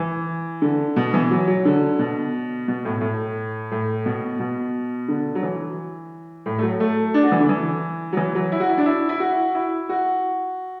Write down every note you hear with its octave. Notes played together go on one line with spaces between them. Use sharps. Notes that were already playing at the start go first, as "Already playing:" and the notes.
Already playing: E3
D3
B2
E3
F#3
F#3
D3
B2
B2
A2
A2
A2
B2
B2
D3
F#3
E3
A2
A3
F#3
A3
D4
F#4
E3
D3
E3
F#3
E3
F#3
E4
F#4
E4
D4
E4
E4
F#4
E4
F#4